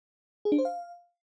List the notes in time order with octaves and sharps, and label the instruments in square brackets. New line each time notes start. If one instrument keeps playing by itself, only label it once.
[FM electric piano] G#4
D4
C5
F5